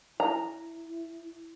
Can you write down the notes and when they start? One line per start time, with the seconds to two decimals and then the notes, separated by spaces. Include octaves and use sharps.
0.20 E4 A#5